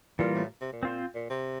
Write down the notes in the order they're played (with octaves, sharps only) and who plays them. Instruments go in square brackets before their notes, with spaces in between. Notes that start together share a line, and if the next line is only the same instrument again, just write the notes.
[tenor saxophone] A#2 [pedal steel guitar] E3 G3 A#3 F4 A#4
[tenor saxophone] A2
C3
A#2
[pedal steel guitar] C4 F4 C5
[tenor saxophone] A#2
C3